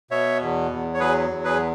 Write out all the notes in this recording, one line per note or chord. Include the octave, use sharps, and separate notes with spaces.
B2 C#5 E5
E2
E2
C#5
F#3 G#4 B4
E2
G#4 B4